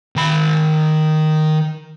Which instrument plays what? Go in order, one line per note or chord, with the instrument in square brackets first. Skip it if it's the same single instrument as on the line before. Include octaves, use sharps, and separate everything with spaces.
[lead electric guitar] D#3 B5